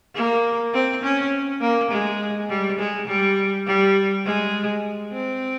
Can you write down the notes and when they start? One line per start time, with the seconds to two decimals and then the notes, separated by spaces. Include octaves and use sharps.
0.15 A#3
0.73 C4
1.03 C#4
1.61 A#3
1.91 G#3
2.49 G3
2.79 G#3
3.07 G3
3.66 G3
4.25 G#3
5.12 C4